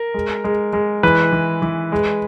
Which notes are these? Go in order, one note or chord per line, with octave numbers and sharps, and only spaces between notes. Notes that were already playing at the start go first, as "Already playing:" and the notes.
Already playing: A#4
G#3
G#3
G#3
E3 B4
E3
E3
G#3